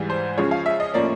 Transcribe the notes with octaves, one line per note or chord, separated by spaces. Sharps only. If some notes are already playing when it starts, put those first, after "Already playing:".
Already playing: G#2 E3 G3
C5
C#3 F3 G#3 C#5
F5
E5
D#5
A2 F3 A#3 C#4 D5